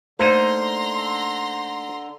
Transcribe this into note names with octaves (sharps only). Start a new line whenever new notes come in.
D3 A3 A#3 D#4 C5 A#5 C6